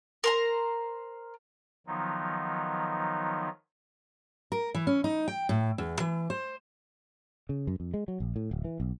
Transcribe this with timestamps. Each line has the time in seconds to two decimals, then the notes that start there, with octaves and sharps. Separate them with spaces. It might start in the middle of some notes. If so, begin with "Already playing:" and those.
0.24 A#4 C5 A#5
1.87 D#3 F3 F#3 B3 D#4
4.52 A#4
4.74 E3
4.87 C#4
5.04 D#4
5.28 G5
5.49 A2
5.78 E2
6.00 E3
6.30 C5
7.49 C#3
7.67 F#2
7.80 F2
7.94 G#3
8.08 F#3
8.20 A#1
8.36 A2
8.51 D1
8.65 E3
8.80 B1